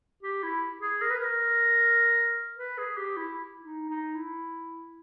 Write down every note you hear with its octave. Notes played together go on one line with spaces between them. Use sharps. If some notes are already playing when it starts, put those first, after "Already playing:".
G4
E4
G#4
A#4
B4
A#4
B4
G#4
G4
E4
D#4
D#4
E4